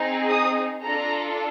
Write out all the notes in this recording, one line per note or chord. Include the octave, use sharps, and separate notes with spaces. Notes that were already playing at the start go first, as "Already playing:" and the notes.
Already playing: C4 D#4 G#4
D#6
D4 F4 A4 A#5